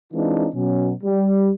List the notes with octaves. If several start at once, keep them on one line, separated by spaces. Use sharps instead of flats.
E3 G#3 C4 D4 D#4 F4
B2 F#3 C#4
G3